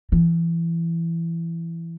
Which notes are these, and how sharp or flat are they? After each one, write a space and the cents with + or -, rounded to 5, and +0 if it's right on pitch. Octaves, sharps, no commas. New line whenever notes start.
E3 +20